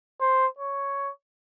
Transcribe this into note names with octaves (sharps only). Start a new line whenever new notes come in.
C5
C#5